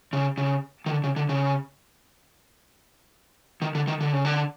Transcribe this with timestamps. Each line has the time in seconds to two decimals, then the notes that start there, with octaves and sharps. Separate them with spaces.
0.13 C#3
0.38 C#3
0.86 D#3
0.91 D3
1.04 C#3
1.16 D3
1.29 C#3
3.62 D#3
3.75 D3
3.87 D#3
4.01 D3
4.13 C#3
4.25 D3